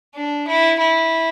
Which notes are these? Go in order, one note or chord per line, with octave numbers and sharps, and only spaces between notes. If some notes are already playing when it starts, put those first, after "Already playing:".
D4
E4
E4